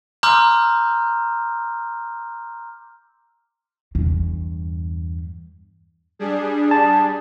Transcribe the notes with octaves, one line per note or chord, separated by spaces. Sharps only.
A#5 C6 D6 E6 F6 G6
E2 G2
G3 D4 G#4
A5